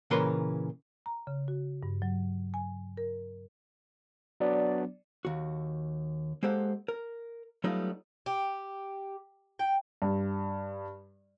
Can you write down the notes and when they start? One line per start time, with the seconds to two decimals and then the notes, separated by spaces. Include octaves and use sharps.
0.10 A#2 C#3 E3 A#4 B4 C6
1.06 A#5
1.27 C#3
1.48 F#4
1.83 G2
2.02 F#3
2.54 G#5
2.97 A#4
4.40 F#3 B3 D4 D5
5.25 D#2 F#4
6.43 G#3 A#3 G4 A4 C5 F#5
6.88 A#4
7.64 F#3 G3 A3 B3 D#4 F4
8.26 G4
9.59 G5
10.02 G2